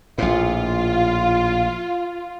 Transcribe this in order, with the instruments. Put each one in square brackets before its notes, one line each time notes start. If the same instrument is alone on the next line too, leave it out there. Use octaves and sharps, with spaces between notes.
[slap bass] A#1 A2 [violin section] F4